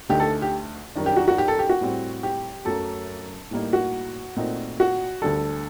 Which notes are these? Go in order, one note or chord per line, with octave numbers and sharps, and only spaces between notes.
D2 D3 A3 D#4 G4
A4
G4
F#2 D#3 G3 D4
G4
F#4
F#4
G4
A4
G4
F#4
A2 G3 C4
G4
F#2 F#3 A3 A4
A2 G3 A#3 D#4
F#4
A#2 A3 C4 D#4
F#4
D2 D3 G3 A4